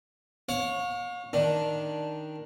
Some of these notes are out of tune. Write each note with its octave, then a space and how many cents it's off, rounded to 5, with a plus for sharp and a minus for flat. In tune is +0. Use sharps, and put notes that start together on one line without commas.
C#5 -10 F5 +40 C#6 +20
D#3 +0 D4 +0